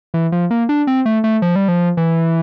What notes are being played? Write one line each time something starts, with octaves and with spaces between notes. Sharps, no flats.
E3
F3
A#3
D4
C4
A3
A3
F3
G3
F3
E3